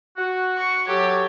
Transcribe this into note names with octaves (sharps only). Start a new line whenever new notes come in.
F#4
C#6
F#3 G4 A4 C#5